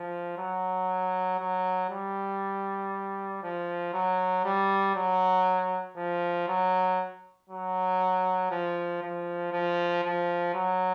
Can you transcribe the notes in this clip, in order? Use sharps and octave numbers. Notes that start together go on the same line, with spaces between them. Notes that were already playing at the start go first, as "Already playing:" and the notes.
Already playing: F3
F#3
F#3
G3
F3
F#3
G3
F#3
F3
F#3
F#3
F3
F3
F3
F3
F#3